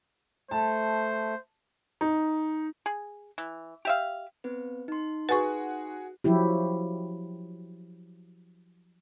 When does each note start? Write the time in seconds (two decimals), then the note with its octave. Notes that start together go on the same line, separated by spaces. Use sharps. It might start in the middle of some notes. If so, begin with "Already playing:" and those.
0.51 A3 C5 A5
2.01 D#4
2.86 G#4
3.38 E3
3.85 G4 E5 F5
4.44 B3 C4 B4
4.88 D#4 C6
5.29 F#4 G#4 B4 C#6
6.24 F3 F#3 E4 G4